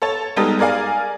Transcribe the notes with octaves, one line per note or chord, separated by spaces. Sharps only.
A4 C#5 A5
G3 G#3 B3 D#4 G4 A4
G#4 A#4 D5 F5 G#5